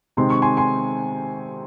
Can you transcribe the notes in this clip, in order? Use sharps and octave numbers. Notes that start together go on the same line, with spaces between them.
C3 D#3 G#3 C4 C6
C#6
G#5 C6
G#5 C6